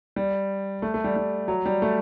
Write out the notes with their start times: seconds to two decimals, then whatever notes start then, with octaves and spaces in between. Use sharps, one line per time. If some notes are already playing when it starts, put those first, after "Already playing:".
0.16 G3
0.82 A3
0.94 A3
1.04 G3
1.16 G3
1.48 F#3
1.66 G3
1.82 A3